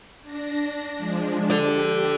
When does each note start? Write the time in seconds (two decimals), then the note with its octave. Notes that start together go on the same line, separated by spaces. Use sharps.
0.23 D4 A#6
0.98 F3 G#3 D4
1.50 G4 A4 D5